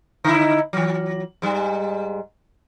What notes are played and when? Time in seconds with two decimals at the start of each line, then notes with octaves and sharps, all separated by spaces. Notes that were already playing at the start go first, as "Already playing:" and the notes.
0.24 D3 D#4 E4
0.73 E3 F#3
1.42 G#2 G3